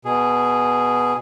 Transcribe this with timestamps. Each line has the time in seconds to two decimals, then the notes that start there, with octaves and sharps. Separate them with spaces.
0.05 B2 G#4